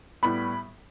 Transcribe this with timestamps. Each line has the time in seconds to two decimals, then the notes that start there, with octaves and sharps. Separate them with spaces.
0.23 A2 G3 B3 B5